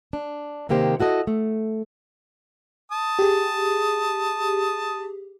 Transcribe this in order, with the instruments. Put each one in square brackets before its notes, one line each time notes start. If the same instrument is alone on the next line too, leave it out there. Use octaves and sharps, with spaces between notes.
[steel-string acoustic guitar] D4
C3 D#3 A#3 G4 C5
E4 F#4 A4 D#5
A3
[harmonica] A5 D#6
[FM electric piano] G4 G#4